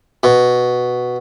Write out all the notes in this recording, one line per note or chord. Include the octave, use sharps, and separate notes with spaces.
B2